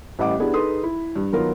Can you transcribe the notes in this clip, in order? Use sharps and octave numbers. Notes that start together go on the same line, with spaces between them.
A1 G3 E4 D#5 F#5 D6
B3 D4 E4 G4 G#4
D#4 G#4 A4 B4 C6 D#6
E4
G2
D#3 F#3 B3 F4 A#4